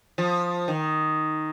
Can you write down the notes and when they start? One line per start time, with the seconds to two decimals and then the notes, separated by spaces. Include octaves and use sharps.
0.18 F3
0.68 D#3